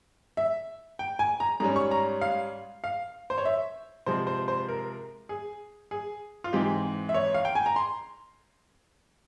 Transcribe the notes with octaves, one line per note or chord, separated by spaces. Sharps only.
E5
G5
G#5
A#5
G#2 G3 C#4 A#5
C#6
A#5
F5
F5
C5
C#5
E5
C3 F3 G#3 C4 C5
C5
C5
A#4
G#4
G#4
F4
G#2 E3 G#3 C4 G4
E5
C#5
F5
G5
G#5
A#5
C6